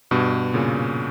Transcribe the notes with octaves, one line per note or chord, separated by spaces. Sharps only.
G2 B2
A#2 C#3